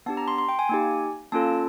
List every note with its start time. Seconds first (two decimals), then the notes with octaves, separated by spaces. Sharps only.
0.06 B3 D4 G4 A5
0.17 A#5
0.28 C6
0.38 C6
0.49 G5
0.59 G#5
0.69 A#3 D#4 G4
1.32 A#3 C#4 F4 A4 A5